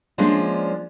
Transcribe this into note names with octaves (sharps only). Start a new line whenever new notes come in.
F3 G#3 A#3 C#4 D4 F4